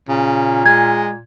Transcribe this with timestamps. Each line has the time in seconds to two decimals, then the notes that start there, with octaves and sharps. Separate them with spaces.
0.09 A#2 C#3
0.66 G#3 G#6